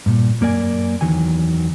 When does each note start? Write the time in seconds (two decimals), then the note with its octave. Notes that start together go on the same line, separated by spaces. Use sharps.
0.06 G2 A#2
0.41 F#2 A#3 A#4 D5 G#5
1.01 E2 G#2 D#3 E3 F#3 G#5